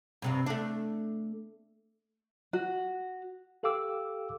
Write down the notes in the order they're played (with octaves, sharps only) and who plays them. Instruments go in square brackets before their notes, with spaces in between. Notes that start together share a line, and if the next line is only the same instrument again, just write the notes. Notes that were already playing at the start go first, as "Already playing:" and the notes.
[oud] G2 C3 G3
A3 D4
[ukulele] F#4
[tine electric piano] G4 A4 F5 G5 D6 E6